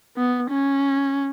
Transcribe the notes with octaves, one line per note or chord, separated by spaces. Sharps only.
B3
C#4